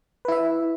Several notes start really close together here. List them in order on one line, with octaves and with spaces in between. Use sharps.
B4 E4 E5